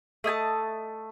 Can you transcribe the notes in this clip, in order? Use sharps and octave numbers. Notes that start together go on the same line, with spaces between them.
A3 D#5 G#5 A5